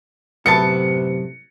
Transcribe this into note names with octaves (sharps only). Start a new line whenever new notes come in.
F#2 A2 C3 B3 E4 A4 A5 C#7